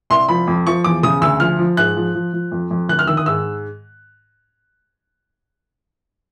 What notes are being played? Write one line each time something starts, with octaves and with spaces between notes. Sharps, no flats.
C2 C6
F3 B5
F2
F3 C#6
E2 D6
C#3 D#6
D2 E6
F3 F6
F3
G#2 F#6
F3
F3
F3
F2
F2
D2 F#6
F6
D#3 E6
D#6
G#2 E6